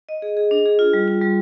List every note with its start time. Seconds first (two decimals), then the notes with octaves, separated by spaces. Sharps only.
0.09 D#5
0.22 G#4
0.37 G#4
0.51 D4
0.66 G#4
0.79 F4
0.93 G3
1.08 F4
1.22 G3